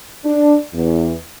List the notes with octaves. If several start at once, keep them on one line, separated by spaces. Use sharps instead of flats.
D4
E2